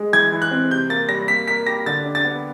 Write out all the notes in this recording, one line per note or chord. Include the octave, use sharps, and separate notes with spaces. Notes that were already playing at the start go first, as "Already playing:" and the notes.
Already playing: G#3
E3 G#6
E3
F#6
C4
C3 G6
A#3 A6
G3 A#6
A#3 B6
A#4 B6
G4 A#6
D3 A6
D4
A6
B3